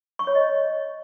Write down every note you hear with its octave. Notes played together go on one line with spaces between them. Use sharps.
C#6
C#5
D#5